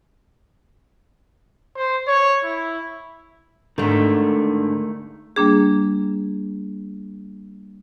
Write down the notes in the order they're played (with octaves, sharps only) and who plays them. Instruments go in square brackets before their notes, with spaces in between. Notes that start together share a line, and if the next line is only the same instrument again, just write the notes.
[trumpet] C5
C#5
E4
[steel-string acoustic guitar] G#2 D3 [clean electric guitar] D#3 A3
[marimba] G3 A#3 D4 G#4